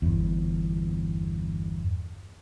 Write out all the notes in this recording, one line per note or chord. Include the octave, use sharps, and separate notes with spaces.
G1 E2